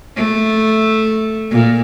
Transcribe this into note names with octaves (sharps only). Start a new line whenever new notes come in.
A3
A#2